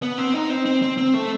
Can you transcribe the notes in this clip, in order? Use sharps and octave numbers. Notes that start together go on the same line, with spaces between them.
B3
C4
D#4
C4
C4
C4
C4
A3